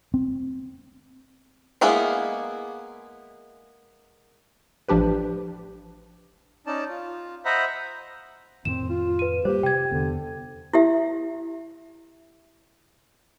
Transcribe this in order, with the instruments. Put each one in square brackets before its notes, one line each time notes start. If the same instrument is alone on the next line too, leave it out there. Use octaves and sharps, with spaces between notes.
[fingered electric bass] C4
[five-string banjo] G#3 A#3 B3 E4 G#4
[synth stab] A1 F3 D4 G4 B4
[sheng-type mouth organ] C#4 D#4 D5 A5
F4
C5 D#5 E5 F#5 A#5 B5
[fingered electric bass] F2 A2 D#3 [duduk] C4 [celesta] E7
[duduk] F4
[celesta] B4 D#7
[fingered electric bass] G3 A#3 [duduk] G4 [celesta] C5
[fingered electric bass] C3 [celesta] G5 G#6
[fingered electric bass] E2 B3 [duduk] D3
[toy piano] E4 G4 E5